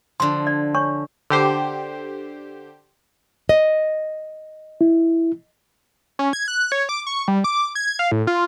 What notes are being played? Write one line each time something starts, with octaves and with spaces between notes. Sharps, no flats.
D3 F3 C6
D5
D4 C#5 C#6
D3 G4 C5
D#5
E4
C#4
G#6
F#6
C#5
D6
C#6
G3
D6
G#6
F5
A2
F4